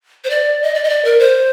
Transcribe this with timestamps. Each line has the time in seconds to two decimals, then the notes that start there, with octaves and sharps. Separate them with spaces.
0.24 C5
0.30 D5
0.63 D#5
0.75 D5
0.84 D#5
0.89 D5
1.05 A#4
1.19 C5